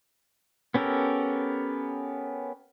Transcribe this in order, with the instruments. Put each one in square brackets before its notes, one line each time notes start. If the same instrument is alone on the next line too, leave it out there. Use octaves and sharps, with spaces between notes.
[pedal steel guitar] B3 C#4 G4 A4 A#4